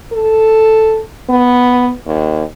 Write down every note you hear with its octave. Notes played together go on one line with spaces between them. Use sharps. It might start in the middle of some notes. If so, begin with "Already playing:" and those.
A4
B3
D#2